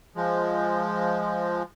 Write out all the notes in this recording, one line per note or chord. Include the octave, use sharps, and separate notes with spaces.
F3 G#3